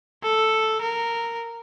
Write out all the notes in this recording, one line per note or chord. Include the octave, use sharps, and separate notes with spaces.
A4
A#4